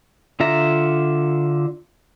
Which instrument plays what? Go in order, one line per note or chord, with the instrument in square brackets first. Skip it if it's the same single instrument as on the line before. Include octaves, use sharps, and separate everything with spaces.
[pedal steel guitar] D3 F4 E5 A#5